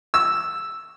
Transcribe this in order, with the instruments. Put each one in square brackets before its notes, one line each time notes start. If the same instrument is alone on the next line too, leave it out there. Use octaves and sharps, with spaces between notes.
[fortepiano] E6